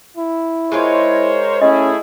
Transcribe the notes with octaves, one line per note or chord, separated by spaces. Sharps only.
E4
G#3 D#4 F4 A#4 C5 C#5
A3 C#4 E4 G#4 D#5